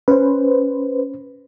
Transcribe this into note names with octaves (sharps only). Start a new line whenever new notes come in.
C#4 B4 C5